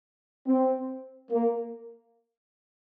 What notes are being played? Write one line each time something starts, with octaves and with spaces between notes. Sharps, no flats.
C4
A#3